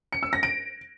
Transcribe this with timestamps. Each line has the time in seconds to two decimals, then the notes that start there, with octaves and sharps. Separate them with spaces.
0.13 C#7
0.23 E6
0.33 A#6
0.43 D7